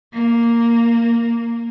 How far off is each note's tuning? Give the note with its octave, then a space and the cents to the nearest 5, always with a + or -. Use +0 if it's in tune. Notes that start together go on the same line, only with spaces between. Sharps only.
A#3 -5